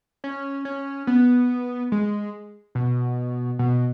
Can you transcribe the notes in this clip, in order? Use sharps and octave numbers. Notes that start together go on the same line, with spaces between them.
C#4
C#4
B3
G#3
B2
B2